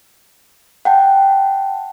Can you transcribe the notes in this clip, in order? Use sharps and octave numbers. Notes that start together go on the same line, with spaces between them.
F#5 G5 A5